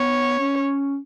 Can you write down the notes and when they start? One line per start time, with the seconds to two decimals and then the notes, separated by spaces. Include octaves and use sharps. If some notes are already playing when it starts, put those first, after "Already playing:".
Already playing: B3 C#5
0.39 C#4